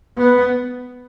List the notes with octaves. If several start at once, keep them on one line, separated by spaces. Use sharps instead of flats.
B3